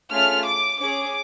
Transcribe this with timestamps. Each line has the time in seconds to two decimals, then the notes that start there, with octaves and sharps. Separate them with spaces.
0.11 A3 C#4 F4 G#4 F6
0.46 D6
0.81 C#4 G#4 D6